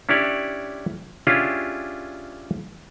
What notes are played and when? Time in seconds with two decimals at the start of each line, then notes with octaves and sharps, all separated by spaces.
0.09 C#4 D4 E4 G4 C#5 D5
1.27 C#4 D4 E4 F4 G4 G#4